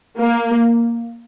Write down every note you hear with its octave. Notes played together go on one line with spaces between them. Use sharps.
A#3